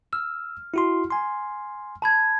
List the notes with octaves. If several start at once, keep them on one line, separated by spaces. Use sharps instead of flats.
E6 F6
E4 F#4 C6
G#5 C6
A5 B5 G#6